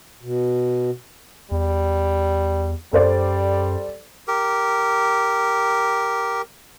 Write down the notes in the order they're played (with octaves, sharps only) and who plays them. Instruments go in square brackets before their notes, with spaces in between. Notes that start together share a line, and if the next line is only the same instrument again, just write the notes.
[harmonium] B2
[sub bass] E2 [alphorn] G3
[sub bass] F#2 [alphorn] G3 [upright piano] A4 C5 D5
[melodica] G4 A#4